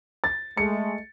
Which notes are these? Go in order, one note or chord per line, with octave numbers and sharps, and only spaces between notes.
A6
G#3 A3 C#7